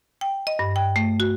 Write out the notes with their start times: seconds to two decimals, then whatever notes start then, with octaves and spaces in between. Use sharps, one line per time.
0.21 G5
0.47 D#5
0.59 G2
0.76 G5
0.96 A3
1.20 F#4